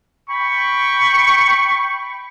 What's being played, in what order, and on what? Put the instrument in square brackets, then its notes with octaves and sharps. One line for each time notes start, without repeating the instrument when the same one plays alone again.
[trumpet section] G5 B5 C#6